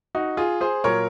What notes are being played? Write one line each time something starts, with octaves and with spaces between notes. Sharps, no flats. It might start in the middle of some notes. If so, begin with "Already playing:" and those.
D#4 F#4
F4 G#4
G#4 C5
A#2 F#3 A#4 C#5